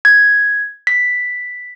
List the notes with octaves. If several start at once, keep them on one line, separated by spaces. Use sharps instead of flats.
G#6
B6